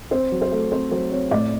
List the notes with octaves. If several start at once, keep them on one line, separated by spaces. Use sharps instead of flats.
C4 C5
F#3
C5
A3
C4 C5
F#3 C5
C4 C#5
A2 D5